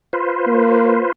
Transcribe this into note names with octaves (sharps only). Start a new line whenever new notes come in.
F4 B4 C5
A#3